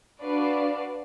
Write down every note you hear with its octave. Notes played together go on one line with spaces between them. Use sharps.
D4 F#4 B4 D5 F5